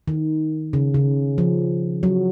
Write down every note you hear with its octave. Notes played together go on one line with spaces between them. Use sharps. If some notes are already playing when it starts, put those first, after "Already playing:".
D#3
C#3
C#3
F3
F#3